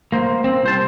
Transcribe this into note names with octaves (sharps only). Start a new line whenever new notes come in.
A#3 C5
C4
C2 C5 A5